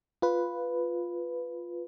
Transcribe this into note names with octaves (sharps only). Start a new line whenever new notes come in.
F4 B4